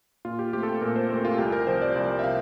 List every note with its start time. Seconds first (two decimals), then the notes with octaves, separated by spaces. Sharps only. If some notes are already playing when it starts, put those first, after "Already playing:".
0.25 A#2 F4
0.39 G4
0.53 A3 C4 G4
0.63 A4
0.68 G4
0.81 A#2 A#4
0.96 C5
1.10 A3 C4 A#4
1.25 F4
1.38 C2 G4
1.52 A#4
1.67 C3 F3 C5
1.82 D5
1.95 C2 D5
2.19 E5
2.24 C3 F5